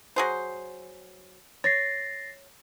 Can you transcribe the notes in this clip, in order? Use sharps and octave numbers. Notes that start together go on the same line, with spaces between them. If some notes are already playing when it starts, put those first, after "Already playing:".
F#3 G#4 C5
C#5 A6 A#6 C7